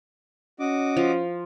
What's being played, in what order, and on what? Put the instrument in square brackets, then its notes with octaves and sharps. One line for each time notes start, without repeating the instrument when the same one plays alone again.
[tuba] C#4 [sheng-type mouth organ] F#4 D#5 D6
[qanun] F3